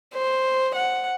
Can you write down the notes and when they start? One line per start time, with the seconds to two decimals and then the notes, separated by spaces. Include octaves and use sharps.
0.14 C5
0.75 F#5